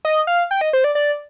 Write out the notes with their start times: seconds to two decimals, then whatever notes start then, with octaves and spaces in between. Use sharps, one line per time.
0.05 D#5
0.27 F5
0.51 G5
0.61 D#5
0.73 C5
0.84 D5
0.95 D5